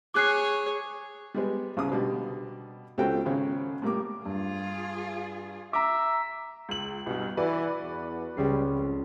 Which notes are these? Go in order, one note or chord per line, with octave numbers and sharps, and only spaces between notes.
G#4 C#5 D6 F#6 C7
G3 G#3 B3
C2 C#3 D#6
B2 D3 G3
C#2 C4 C#4 F#4 A4 G5
G#1 C#3 C#4
A2 G3 A#3 D6
G2 F4 G#4
E5 A#5 D6
C#2 F#7
C2 G2 B2
E3 F#4 B4 D5
E2
C#2 G3 C7
F2